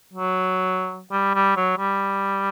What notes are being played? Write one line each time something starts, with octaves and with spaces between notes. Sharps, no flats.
F#3
G3
G3
F#3
G3